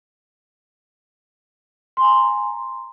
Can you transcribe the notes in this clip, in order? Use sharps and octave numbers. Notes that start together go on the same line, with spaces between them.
G#5 A#5 C6